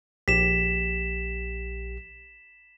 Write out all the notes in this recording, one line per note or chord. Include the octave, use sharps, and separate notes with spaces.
A#1 G4 B6 E7